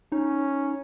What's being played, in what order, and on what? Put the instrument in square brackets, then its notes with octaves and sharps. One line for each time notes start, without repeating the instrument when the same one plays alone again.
[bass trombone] C#4 [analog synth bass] D#4